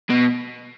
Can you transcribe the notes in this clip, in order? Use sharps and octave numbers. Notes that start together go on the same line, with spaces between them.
B2